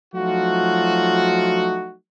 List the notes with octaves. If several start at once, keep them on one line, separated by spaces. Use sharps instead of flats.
F3 F#3 A3 D#4 F4 F#4